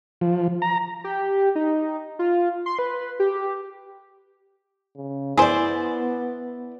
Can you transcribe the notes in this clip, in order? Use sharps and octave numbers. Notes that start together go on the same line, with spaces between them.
F3
A#5
G4
D#4
F4
C6
B4
G4
C#3
B3 E4 G#4 C5 D5